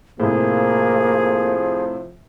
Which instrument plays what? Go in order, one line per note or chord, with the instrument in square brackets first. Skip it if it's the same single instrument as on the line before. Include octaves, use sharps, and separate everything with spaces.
[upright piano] A2 C3 [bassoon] F3 [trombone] A#3 [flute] G#4